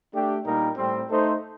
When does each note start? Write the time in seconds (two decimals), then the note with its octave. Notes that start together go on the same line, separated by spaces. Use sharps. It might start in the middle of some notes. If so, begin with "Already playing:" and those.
0.13 A3 D4 G4
0.44 A#2 G3 A#3 D#4 A#4
0.77 A2 G3 C4
1.09 A3 D#4 A4 C5